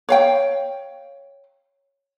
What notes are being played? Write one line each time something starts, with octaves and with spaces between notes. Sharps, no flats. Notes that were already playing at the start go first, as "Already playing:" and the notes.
C#5 F5 G5